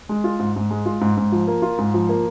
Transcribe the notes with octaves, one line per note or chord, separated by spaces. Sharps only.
G#3
F4
G#2
G#2
G#3
F4
G#2
G#2
F3
A#3
F4
G#2
F3
A#3